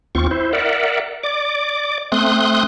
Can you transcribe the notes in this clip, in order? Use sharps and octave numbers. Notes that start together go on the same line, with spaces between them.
D#2 C4 F4 C#6
E4 C5
A#4 D5 E5 F#5
D5 D6
A3 C4 C6 D#6 F#6